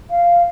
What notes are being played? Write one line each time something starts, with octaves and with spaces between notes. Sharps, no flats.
F5